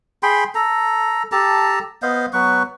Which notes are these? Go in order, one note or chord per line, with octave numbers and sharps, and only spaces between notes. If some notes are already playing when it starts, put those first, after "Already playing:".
G#4 G5 B5 C6
A4 A#5
G4 A4 A5 A#5
B3 C5 D#5 F5
F#3 B3 B4 C#6